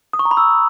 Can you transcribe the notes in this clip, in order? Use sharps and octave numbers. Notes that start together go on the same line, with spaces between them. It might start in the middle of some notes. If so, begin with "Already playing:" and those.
D#6
C#6
A#5
B5
E6